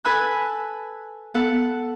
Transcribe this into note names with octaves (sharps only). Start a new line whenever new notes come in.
A4 B4 G#5 B5 E6 F#6
B3 A4 F#5